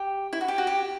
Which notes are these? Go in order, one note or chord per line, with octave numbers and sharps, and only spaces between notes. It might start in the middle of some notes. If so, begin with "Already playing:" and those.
Already playing: G4
E4
F#4
G4
F#4
G4